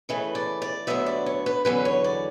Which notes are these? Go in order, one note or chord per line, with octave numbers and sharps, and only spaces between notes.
C#3 E3 A3 B4
D5
D5
D2 C#3 F#3 B3 E5
D5
C#5
B4
E2 D3 F#3 C#4 B4
C#5
D5